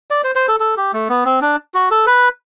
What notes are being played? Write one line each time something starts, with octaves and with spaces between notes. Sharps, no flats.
D5
C5
C5
A4
A4
G4
A3
B3
C4
D4
F#4
A4
B4